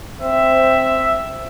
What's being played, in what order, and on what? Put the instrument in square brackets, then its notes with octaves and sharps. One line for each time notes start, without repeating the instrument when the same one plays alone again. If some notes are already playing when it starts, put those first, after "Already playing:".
[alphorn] C4 [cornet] E5